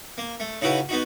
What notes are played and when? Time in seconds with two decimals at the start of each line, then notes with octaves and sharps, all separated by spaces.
0.18 A#3
0.40 A3
0.62 C#3 D#4 E4 F#4 B4
0.89 B3 D#4 F#4